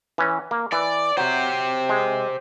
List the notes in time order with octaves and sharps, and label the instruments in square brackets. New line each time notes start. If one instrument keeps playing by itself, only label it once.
[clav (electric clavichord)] E3 C#4
A#3
[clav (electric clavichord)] E3 [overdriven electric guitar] D5
[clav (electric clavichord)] F#3 [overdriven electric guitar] G4 C5
[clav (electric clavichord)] G#3